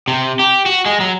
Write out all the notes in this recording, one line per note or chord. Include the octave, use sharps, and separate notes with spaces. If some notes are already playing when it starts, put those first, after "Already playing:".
C3
G4
F#4
G#3
F#3